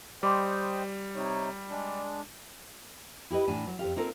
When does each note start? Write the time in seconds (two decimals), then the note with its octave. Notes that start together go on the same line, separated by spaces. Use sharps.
0.23 G3 C5 D#5 G5 B5 C6 D6
1.16 C3 D#4 C#5
1.70 G#3 D4
3.30 E4 G4 B4 D#5
3.48 A2 E3 D4 G#5
3.67 F#3
3.79 F2 D#3 G4 F5
3.96 A#3 C4 D#4 F4 A4 A#4